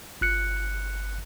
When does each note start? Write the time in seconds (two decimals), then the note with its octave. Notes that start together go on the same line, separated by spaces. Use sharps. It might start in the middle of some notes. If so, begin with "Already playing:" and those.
0.21 G1 F#6 C#7